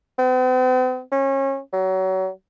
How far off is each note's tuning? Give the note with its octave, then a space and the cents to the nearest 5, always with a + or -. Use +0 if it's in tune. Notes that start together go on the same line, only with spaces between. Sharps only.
C4 -45
C#4 -30
F#3 +30